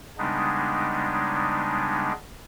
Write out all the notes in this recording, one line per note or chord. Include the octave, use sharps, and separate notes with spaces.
C#3 G3 G#3 B3 D4 D#4